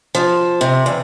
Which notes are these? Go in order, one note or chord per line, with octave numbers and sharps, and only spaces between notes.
F3
C3
E2